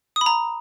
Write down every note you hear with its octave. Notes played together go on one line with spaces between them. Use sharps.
D#6
B5
A#5